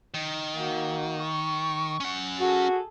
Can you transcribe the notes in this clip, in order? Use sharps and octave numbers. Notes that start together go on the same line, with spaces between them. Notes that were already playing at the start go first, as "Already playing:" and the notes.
D#3
A#3 F#4
C#6
C#4 F#5
F#4 G#4 A4